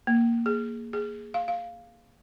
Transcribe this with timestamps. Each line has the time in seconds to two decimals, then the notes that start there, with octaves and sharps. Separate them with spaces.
0.07 A#3
0.46 G#4
0.93 G#4
1.34 F5
1.48 F5